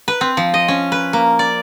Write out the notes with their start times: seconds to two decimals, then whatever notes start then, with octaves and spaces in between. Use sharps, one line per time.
0.08 B4
0.21 C4
0.37 F3
0.54 D#5
0.68 C#4
0.92 B4
1.13 A#3
1.39 D5